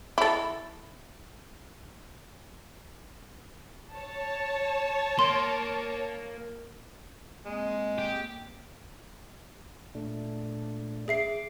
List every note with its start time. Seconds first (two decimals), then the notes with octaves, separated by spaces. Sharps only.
0.18 E4 A4
3.93 C#5 A5
5.19 A#3 C6
7.45 G#3 A#3 C4
7.98 G4
9.95 A#2 A3 D4
11.08 G#4 E5 D6 C7